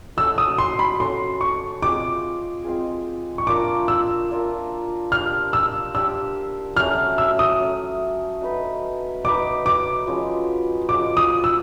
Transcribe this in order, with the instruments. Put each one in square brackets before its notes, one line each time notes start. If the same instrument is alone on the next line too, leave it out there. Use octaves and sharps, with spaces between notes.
[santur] C#4 F#4 A4 [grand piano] E6
[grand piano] D#6
C6
B5
[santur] C#4 F#4 A4 [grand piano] C6
[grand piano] C#6
[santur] G#3 C4 F4 G#4 [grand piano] D6
[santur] G#3 C4 F4 G#4
[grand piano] C#6
[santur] A#3 D4 F4 A#4 [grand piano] D6
[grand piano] E6
[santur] A#3 D4 F4 A#4
[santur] D4 G4 C5 [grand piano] F6
[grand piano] E6
[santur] D4 G4 C5 [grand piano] E6
[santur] F#3 A3 C#4 [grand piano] F6
[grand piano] E6
D#6
[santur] F#3 A3 C#4
D#4 F#4 B4
[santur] D#4 F#4 B4 [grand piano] D6
[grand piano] D6
[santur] F3 G#3 C#4 F#4
[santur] F3 G#3 C#4 F#4 [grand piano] D6
[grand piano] D#6
E6